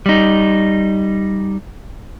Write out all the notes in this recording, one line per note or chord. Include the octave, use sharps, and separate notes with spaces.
G3 D#4